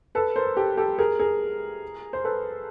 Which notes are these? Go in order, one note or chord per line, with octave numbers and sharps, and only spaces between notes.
A4 B4
A#4 C5
G4 A4
G4 A4
G#4 A#4
G#4 A#4
C5
A4 B4